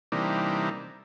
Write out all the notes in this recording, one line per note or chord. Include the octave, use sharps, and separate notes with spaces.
C3 E3 G3 A#3 D4 D#4